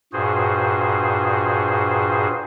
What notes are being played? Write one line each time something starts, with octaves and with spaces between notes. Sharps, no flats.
G2 A#2 F#4 G#4 C5